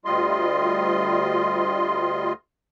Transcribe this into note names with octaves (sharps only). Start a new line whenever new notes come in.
D2 G3 F4 D#5 C6